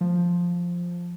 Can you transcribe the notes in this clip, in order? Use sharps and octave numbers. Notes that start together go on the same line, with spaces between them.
F3